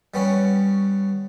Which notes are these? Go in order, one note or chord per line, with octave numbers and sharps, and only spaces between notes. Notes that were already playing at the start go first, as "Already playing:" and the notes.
G3 B3 C#4